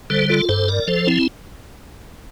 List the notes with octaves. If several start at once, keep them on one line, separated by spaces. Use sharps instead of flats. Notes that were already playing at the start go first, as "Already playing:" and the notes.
D3 G3 A4 C5
F4 A4
G2 A4 C5
A#4 D5
F3 A4 C5
C4 E4